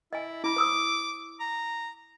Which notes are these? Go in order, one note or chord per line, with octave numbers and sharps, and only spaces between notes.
E4 D#5 G#5
E4 B5 D6
C5 D#6 E6
A#5